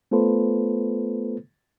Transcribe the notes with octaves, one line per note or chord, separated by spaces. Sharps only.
A3 B3 F4 A4 B4 C5